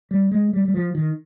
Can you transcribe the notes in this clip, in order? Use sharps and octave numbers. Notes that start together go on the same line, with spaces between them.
G3
G#3
G3
G3
F3
D#3